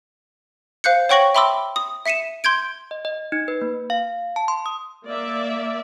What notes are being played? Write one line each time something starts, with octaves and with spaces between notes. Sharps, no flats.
C5 F5 F#6 G6 C#7
C#5 F#5 G5 C#6 A#6 F#7
E5 G5 B5 C6 D6 E6
D#6
E5 B6 C#7 D#7 E7
C6 G6 G#6 D7
D#5
D#5
D#4
B4
A#3
F5
A5
C6
D#6
A#3 D5 E5